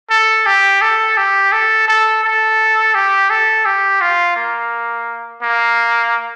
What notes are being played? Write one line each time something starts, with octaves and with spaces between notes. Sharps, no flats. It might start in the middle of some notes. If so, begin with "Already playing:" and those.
A4
G4
A4
G4
A4
A4
A4
G4
A4
G4
F4
A#3
A#3